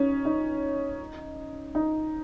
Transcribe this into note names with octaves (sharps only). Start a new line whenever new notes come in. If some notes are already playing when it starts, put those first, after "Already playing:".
Already playing: C#4 D#4
D#4
D#4